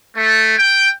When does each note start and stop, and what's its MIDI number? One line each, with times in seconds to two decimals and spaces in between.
0.16 0.55 57
0.58 0.90 79